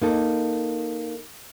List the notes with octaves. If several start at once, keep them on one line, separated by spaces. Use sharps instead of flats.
A#3 D#4 A4